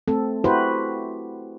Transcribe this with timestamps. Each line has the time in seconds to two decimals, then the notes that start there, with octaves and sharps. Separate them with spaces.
0.08 A3 C4 A4
0.44 E4 F#4 G4 B4 C5